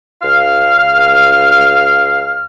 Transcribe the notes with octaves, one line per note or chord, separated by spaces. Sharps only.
C#2 F5 F6